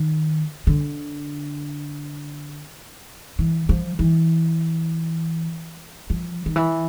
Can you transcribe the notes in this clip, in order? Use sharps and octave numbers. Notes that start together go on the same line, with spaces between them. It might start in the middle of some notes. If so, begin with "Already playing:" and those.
Already playing: D#3
D3
E3
F3
E3
F3
D#3
E3